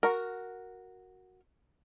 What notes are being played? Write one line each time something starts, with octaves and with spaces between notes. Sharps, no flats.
F#4 A#4